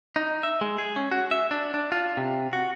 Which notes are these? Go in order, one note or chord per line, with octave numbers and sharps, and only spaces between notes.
D#4
E5
G#3
G#4
C#4
F#4
E5
D4
D4
F4
C3
F#4